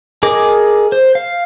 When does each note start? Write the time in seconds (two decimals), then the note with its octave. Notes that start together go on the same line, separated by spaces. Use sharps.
0.23 G#4 A#4 D#5 D6
0.92 C5
1.15 F5